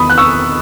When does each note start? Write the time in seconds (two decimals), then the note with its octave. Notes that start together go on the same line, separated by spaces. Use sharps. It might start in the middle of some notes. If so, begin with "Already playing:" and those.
Already playing: E2 D#3 B5 D#6
0.10 F#6
0.18 C#6 E6